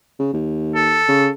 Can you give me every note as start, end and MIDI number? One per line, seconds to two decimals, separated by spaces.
0.19 0.29 49
0.33 1.00 39
0.75 1.28 69
1.08 1.30 49